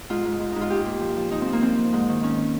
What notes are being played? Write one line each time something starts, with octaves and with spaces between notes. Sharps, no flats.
G#2 F4
G#2
G#2
G#2 D#4
F4
A#2 G4
A#2
F3
F3
F3 D#4
C4
F3
A#3
F3 C4
F3
G#2
D#3
D#3 C#4